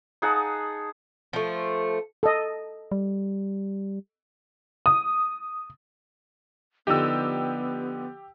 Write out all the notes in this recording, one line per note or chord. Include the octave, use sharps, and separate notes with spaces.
D#4 G#4 F#5 A5
F3 A3
A4 D#5
G3
D#6
D3 F3 B3 D#4 G4 E6